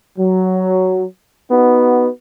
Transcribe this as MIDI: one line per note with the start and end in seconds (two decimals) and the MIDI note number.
0.19 1.04 54
1.50 2.08 59
1.50 2.08 63
1.50 2.08 66